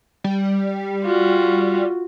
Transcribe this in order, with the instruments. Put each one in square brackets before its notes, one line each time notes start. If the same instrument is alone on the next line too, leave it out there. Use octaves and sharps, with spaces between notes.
[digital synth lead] G3
[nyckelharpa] F4 F#4